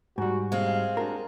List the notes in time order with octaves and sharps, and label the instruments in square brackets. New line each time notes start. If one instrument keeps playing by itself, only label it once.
[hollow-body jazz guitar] G#2 G3 [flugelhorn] F#4
[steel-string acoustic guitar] G#3 C4 [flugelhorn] F5
[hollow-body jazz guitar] D4 F#4 A#4